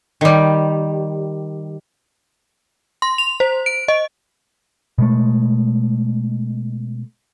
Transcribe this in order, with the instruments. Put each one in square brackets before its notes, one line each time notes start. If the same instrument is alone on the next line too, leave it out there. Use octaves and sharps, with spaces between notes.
[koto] D#3 G3
[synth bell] C6
F7
C5
D7
D#5
[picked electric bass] B2 G#3 A3